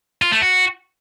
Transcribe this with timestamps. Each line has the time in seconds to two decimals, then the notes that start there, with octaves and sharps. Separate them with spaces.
0.22 F4
0.32 A3
0.42 F#4